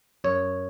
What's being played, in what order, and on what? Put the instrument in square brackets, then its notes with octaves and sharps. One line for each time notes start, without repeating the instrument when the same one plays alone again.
[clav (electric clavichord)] F#2 C#5